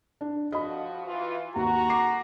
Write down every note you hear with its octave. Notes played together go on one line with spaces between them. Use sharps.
D4
F3 F#4 D#5 B5
E3 F4
D#2 F#4 A#5
D6 C7